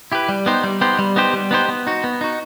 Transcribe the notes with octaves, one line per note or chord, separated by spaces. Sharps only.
E4 G4 B4
G3
B3 D#4 G4 C5
G3
B3 D#4 G4 C5
G3
B3 D#4 G4 C5
G3
B3 D#4 G4 C5
B3
D#4 F#4
B3
D#4 F#4